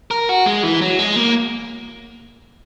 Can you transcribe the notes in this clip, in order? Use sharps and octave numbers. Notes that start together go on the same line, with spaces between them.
A#4
F#4
G#3
E3
F#3
G#3
A#3